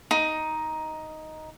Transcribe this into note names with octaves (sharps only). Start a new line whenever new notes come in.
D#4